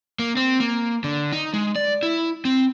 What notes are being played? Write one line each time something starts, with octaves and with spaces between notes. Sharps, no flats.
A#3
C4
A#3
D3
D#4
G#3
D5
E4
C4